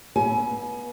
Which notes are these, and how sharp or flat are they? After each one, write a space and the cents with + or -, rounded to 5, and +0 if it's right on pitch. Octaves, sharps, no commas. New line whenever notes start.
B3 -30 E5 +0 G#5 +30